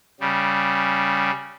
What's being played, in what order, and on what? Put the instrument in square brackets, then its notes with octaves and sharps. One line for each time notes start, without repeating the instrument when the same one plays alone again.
[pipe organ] C#3 G3